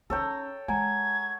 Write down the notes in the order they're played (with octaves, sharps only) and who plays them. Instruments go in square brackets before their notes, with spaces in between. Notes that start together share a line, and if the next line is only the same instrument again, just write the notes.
[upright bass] C#4 D#4 [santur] A4 C#5 G5 [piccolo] A#5
[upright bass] G#3 [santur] F#5 [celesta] G#5 A#5 [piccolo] G#6